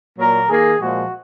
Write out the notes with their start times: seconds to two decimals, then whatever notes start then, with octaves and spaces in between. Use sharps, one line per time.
0.18 A#2 F#3 A#3 A#4
0.49 D#3 A#3 G#4
0.80 A#2 F3 G#3 F#4